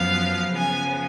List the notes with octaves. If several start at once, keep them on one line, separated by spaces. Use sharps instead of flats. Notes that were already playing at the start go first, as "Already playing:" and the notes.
Already playing: F#2 F3 B3 F5
C#3 F3 B3 G#5